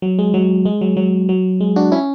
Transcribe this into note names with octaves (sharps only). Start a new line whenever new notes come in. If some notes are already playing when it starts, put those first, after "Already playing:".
F#3
G#3
F#3
G#3
F#3
F#3
F#3
G#3
D4 F#4
C#4 E4